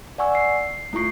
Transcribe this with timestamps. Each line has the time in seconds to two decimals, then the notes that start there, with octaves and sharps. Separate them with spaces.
0.18 D5 F#5 G#5 C#6 E6
0.35 C7
0.93 A3 E4 F4 C#6 C7